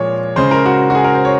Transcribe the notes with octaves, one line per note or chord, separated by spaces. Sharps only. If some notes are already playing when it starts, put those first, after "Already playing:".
Already playing: A#2 F3 G#3 C#5
C#3 G#3 C5
A#4
F#4
F#4
G#4
A#4
C5
C#5